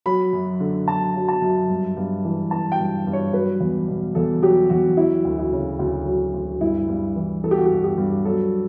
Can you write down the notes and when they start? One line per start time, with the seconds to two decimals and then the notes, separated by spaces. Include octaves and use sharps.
0.06 F#3 B5
0.33 F#2
0.60 D3
0.88 F#2 A5
1.15 F#3
1.28 A5
1.42 F#2
1.69 G2
1.97 G2
2.25 E3
2.51 E3 A5
2.72 G5
2.79 G2
3.07 G2
3.13 C#5
3.33 F#3 B4
3.60 E2
3.88 B2
4.15 E2 A4
4.42 F#3 G4
4.70 E2 F#4
4.97 F#3 E4
5.25 D2
5.39 E4
5.53 C#3
5.79 D2
6.06 F#3
6.34 D2
6.61 G2 E4
6.88 G2
7.16 E3
7.44 E3 A4
7.51 G4
7.58 F#4
7.66 G4
7.71 G2
7.84 G4
7.98 G2
8.25 F#3 A4